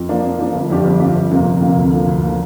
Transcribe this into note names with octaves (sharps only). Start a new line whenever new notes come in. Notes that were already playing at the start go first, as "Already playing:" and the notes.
Already playing: F2
F3 A#3 D4
F2
F3 A#3 D4
G1
F2 F3 D4 G4
G1
F2 F3 D4 G4
G1
F2 C3 A#3
G1
F2 C3 A#3
D2
D3 F3 A#3
D2
D3 F3 A#3